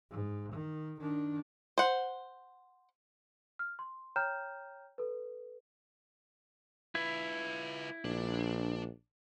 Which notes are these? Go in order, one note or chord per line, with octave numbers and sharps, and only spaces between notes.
G#2
D#3
D#3 D4
C5 F#5
F6
C6
C#5 G5 A#5 F6 G6 E7
A4 B4
E4 F4 B4
A#1 D4